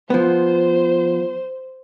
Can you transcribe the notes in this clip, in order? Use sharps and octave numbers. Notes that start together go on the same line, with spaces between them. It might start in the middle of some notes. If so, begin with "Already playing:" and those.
F3 B3 C5